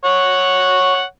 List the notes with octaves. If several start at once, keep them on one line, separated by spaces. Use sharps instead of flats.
C#5 F#5